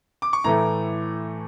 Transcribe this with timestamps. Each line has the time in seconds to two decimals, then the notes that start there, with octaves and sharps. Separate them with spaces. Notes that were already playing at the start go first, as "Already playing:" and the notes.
0.22 D6
0.33 C#6
0.44 A2 E3 A3 A#5